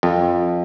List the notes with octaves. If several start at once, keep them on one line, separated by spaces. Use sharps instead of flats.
F2